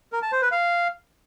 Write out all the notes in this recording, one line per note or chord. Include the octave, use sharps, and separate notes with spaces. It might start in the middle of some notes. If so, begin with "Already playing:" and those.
A#4
A5
C5
B4
F5